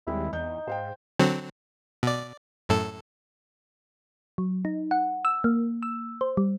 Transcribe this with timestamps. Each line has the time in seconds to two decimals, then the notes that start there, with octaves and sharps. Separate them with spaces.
0.07 D#2 G3 G#3 C4 E4
0.33 E2 D#4 G6
0.67 G#2 C5 F5 G5
1.19 D3 F#3 C4
2.03 B2 D5
2.69 F#2 A2 A4
4.38 F#3
4.65 D#4
4.91 F#5
5.25 E6
5.44 A#3
5.83 E6
6.21 C5
6.37 G3